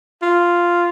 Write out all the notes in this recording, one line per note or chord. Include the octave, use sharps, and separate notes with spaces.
F4